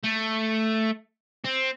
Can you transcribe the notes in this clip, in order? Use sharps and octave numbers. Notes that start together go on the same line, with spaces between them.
A3
C4